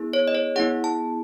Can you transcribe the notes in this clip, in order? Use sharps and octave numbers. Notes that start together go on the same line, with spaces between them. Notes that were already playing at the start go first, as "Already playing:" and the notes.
Already playing: B3 E4 G#4
C#5
D#5
C#5
B3 E4 G#4 F#5
A5